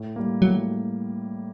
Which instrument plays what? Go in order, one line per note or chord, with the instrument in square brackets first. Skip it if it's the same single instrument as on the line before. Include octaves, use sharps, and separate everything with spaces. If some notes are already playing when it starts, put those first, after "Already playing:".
Already playing: [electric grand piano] A2
G3 A#3
[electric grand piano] A2 [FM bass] F#3